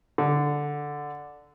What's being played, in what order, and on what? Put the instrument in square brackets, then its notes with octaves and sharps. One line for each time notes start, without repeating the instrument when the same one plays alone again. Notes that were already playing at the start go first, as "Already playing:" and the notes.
[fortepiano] D3